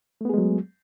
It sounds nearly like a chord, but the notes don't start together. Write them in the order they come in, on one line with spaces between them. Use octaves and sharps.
A3 B3 G#4 G#3 F#3